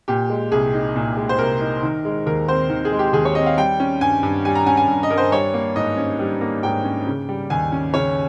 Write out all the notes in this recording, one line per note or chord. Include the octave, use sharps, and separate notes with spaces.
A#2 G4
G#3
C2 G#4
D#4
A#2
G#3
C5
C2 A#4
D#4
D#3
G#3
D#2 A#4
C4 C5
D#3
G#4
G#3
G4
D#2 G#4
C#5
C4 D#5
F5
G3 G5
C#4
G2 G#5
G2
G3 G#5
A#5
C#4 G#5
G#5
G2
D#5
G2 A#4
C5
G3 C#5
A#3
G#2 D#5
C#4
G3
A#3
G#2 G5
C#4
C#3
G3
D#2 G#5
C#4
C#3 C#5